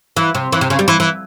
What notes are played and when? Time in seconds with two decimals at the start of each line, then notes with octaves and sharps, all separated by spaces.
0.17 E3
0.35 C3
0.52 E3
0.61 C3
0.70 C#3
0.79 G3
0.88 E3
1.00 E3